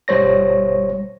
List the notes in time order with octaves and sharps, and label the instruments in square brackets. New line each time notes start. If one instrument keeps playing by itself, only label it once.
[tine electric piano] G1 B2 G3 C5 C#5 A#6